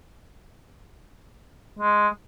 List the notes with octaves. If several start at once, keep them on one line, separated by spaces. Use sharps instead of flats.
G#3